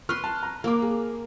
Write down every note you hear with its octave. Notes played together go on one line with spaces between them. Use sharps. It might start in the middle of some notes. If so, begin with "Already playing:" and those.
B4 C6 C#6 F6
A5
A#5
A#3 F5 D6
G#4